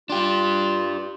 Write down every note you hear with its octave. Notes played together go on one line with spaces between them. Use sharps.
D4 F4 G4